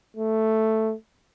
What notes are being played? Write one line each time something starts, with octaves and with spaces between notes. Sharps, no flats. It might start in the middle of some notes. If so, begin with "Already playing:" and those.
A3